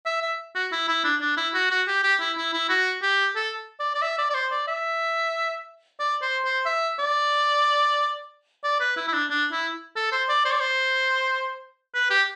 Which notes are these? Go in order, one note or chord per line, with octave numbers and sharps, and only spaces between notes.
E5
E5
F#4
E4
E4
D4
D4
E4
F#4
F#4
G4
G4
E4
E4
E4
F#4
G4
A4
D5
D5
E5
D5
D5
C5
D5
E5
D5
C5
C5
E5
D5
D5
B4
E4
E4
D4
D4
E4
A4
C5
D5
C5
D5
C5
B4
G4